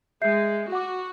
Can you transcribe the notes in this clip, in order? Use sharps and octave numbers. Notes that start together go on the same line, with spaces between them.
G#3 E5 G6 C7
F#4 F#5 D6